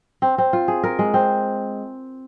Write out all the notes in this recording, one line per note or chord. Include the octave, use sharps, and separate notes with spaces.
C4
C4
F4
G#4
A#4
G#3
C4